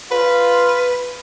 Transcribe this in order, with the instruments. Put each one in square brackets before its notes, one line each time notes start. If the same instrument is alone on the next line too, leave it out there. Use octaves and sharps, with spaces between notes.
[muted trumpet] F4 [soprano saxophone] B4